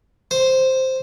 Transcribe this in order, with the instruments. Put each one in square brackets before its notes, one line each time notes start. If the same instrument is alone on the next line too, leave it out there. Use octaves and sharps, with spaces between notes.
[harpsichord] C5